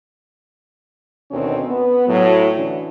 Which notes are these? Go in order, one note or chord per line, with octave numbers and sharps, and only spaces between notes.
D2 B2 D#3 C4 C#4
B3
A2 F#3
D3 E3 C#4